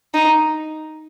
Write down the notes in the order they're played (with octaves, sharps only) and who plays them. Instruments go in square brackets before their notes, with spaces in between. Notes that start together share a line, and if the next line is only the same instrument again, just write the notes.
[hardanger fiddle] D#4